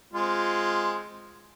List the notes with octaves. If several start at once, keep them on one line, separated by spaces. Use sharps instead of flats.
G#3 C4 F4